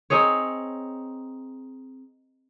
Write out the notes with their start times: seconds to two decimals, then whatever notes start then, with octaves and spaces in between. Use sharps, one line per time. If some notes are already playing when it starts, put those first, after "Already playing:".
0.10 C4 D#4 G#4 C#5